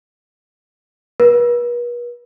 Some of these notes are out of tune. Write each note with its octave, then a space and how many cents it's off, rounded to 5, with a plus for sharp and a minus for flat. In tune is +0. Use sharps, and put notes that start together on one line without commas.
B4 -45